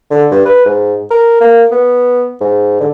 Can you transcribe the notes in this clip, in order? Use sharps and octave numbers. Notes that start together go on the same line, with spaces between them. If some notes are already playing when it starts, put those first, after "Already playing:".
D3
G2
B4
G#2
A#4
A#3
B3
G#2
D3